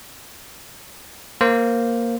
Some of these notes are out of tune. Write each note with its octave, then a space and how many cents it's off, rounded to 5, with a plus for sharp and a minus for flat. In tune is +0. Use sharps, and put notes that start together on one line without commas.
A#3 +0 C5 +0